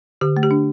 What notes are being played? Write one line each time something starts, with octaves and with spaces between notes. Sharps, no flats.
D3 G4
A3
G4
D4